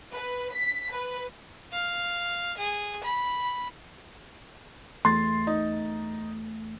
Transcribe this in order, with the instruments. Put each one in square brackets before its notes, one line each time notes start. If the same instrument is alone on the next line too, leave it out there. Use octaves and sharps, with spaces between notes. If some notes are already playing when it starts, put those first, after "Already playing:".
[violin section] B4
B6
B4
[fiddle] F5
G#4
B5
[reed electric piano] E2 A3 A6 [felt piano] C6
[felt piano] D#4